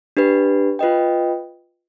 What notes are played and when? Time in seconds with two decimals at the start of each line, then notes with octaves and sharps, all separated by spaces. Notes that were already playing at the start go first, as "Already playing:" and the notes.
0.17 D4 G4 B4
0.79 F4 B4 D#5 G5